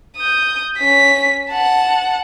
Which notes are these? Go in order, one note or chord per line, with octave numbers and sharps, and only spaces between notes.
D#6 G6
C#4 B6
F#5 A5